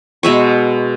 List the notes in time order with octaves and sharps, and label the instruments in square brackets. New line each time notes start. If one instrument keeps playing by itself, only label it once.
[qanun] B2 G#3 E5 C#6